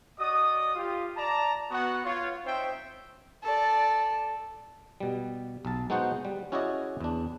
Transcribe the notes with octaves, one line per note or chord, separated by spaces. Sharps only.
F#4 D5 D#5 D#6
F4 G4
D5 A5 A#5
B3 F#4 F#5
F4 C#5
C4 D#4 C5 C#5 E5 G5
A4 D5
B2 G3
B1 A5
G#3 B3 D#4 F#4 C5 F#5
G3
C#4 E4 F#4 G#4 D5 D#5
E2 D4